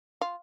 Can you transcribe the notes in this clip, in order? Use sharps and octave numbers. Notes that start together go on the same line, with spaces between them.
F4